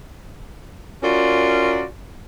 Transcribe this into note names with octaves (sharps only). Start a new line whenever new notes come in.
C#4 F4 F#4 A#4 D5